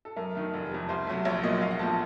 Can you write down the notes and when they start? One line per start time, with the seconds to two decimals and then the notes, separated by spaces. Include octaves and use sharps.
0.05 A4
0.16 F#2 A#4
0.35 D#3 A3
0.54 F1
0.72 F2 C3
0.89 C2 C5
1.07 C3 F#3 A3
1.25 A#1 C#5
1.43 A#2 F#3 A#3 D#5
1.61 A#1 F5
1.71 F#5
1.79 A#2 F3 A3 A5